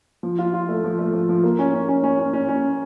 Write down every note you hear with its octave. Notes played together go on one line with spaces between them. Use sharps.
F3
F4
F4
A3
F3
A3
F3
F3
A#3
C#4
C#4
C#4
C#4
C#4
C#4
C#4